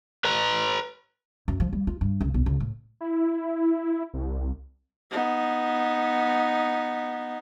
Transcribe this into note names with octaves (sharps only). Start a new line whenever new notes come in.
B4 A#5
F#2
F3
G3
F4
G2
C#2
B1
C#2
A2
E4
C2
B3 D#4